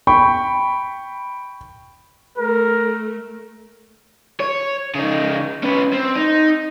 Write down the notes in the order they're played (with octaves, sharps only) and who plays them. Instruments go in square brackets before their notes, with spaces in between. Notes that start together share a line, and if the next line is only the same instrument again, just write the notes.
[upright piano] G5 B5 C#6
[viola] A3 [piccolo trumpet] A#4
[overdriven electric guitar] C#5
C#3 D#4
C#4 B4
C4
D#4